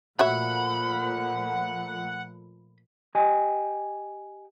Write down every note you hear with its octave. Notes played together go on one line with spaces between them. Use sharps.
A#2 F3 A3 F#4 C#5 E5 F#5 B5
G4 D#5 G5 G#5